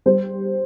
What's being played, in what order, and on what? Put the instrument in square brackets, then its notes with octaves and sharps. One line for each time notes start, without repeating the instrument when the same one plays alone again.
[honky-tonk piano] G3 C5